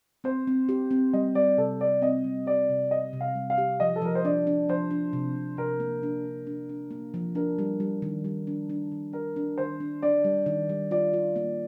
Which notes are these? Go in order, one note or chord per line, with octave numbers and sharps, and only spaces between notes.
C4 C5
C4
G4
C4
G3 D#5
G3 D5
C3 A4
C3 D5
C4 D#5
G3
G4 D5
C3
C3 D#5
C3
F5
G3
F5
G4
F3 D#5
A4
F3 A#4
C5
D4 D5
D4
F3 C5
D4
C3
C3
C3 A#4
A#3
D4
D4
D4
D4
A#3
F3
D4 A#4
G3
G3
D#3
G3
D4
D4
D#3
D4 A#4
D4
D#3 C5
D4
D4 D5
G3
D#3
G3
F4 D5
F4
A#3